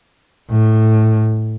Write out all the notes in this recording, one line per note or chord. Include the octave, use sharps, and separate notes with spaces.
A2